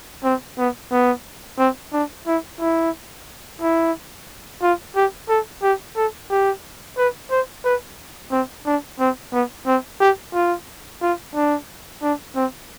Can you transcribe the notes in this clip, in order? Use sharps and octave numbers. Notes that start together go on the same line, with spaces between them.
C4
B3
B3
C4
D4
E4
E4
E4
F4
G4
A4
G4
A4
G4
B4
C5
B4
C4
D4
C4
B3
C4
G4
F4
F4
D4
D4
C4